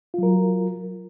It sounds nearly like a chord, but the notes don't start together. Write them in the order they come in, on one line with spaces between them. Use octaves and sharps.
F4 F#3 A#4